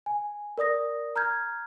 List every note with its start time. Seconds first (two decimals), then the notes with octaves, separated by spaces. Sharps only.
0.06 G#5
0.58 A#4 D5 D#6 A#6
1.16 A#5 F6 G6 G#6